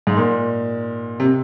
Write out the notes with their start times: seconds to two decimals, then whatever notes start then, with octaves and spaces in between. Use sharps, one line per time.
0.07 G#2
0.17 A#2
1.20 C3